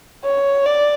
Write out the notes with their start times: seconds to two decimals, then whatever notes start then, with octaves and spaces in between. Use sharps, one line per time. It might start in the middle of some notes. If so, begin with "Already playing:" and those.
0.24 C#5
0.66 D5